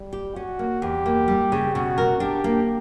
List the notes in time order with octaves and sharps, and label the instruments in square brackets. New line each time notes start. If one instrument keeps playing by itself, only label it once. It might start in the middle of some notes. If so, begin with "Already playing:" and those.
Already playing: [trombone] G3
[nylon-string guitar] G4
[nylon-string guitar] C#4 [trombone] F#4
[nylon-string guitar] A#3
[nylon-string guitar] E2 [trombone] G4
[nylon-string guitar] A#3
G3
C#3
[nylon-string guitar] B2 [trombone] F#4
[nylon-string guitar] A#4
[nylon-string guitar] D4 [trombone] G4
[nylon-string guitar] A#3